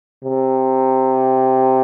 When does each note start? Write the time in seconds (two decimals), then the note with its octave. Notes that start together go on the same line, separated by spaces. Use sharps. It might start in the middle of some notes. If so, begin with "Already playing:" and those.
0.23 C3